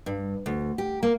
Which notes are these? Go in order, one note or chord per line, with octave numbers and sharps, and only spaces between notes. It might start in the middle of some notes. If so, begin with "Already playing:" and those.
G2
D2
G4
A#3